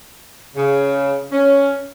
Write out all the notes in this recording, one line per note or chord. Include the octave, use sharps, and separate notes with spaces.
C#3
C#4